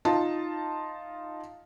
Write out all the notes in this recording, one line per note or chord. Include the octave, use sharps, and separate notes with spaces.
D#4 F4 A5